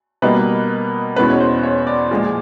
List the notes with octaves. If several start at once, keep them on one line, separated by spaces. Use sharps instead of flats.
B2 G3 A#3 D#4 B4
E2 B2 G#3 C#4 B4
C#5
C5
C#5
D5
A#2 F3 G#3